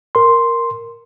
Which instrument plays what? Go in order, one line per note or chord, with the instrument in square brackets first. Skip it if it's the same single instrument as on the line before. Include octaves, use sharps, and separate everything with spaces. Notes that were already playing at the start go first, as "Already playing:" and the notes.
[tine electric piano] A#4 C6